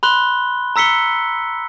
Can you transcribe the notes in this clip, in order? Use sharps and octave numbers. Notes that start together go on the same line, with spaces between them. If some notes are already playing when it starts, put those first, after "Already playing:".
B5 C6 F#6 G7
A#5 E6 B6 C#7 G7